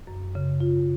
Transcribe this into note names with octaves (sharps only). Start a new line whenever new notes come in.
F#2
C#3
F4